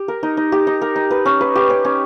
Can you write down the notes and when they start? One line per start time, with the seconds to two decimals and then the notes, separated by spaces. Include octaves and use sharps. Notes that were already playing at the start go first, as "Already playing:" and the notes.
Already playing: G4
0.08 A#4
0.23 D#4
0.37 D#4
0.52 G4
0.67 D#4
0.82 A#4
0.96 D#4
1.11 B4
1.26 C#4
1.41 B4
1.55 G4
1.70 C#4
1.85 C#4